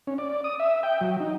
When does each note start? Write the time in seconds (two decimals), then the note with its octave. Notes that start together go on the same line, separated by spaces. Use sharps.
0.07 C#4
0.18 D5
0.44 D#6
0.60 E5
0.83 G5
1.01 F#3
1.20 D#4